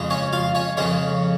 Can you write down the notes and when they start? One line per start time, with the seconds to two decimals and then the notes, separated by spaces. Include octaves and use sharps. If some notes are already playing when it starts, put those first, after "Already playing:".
Already playing: F2 C#3 G#3
0.10 C#4 C#5
0.33 F4 F5
0.55 C#4 C#5
0.77 F2 C#3 G#3 C#4 C#5